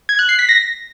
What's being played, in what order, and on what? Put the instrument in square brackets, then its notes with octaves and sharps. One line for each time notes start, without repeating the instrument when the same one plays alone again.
[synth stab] G#6
F#6
C7
B6
A#6